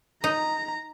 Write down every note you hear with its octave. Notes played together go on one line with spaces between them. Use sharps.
D#4 A#5